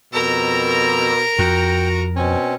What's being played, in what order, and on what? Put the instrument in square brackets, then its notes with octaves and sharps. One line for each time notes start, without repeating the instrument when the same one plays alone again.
[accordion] F2 E6 [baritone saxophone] B2 [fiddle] A#4 A#5
[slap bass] F2 [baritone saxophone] F#4 [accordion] G5
[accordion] B2 C4 [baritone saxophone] C#4